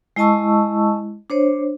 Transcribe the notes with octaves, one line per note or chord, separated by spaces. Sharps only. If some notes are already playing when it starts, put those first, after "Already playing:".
G#3 E4 D#5 A5 C#6 E6
D4 C5 C#5